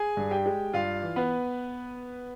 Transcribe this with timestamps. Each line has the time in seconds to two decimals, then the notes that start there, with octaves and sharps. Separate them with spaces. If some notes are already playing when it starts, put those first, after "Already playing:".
Already playing: G#4 G#5
0.17 G2
0.31 G4 G5
0.46 G#3
0.73 G2 F4 F5
1.03 E3
1.16 B3 B4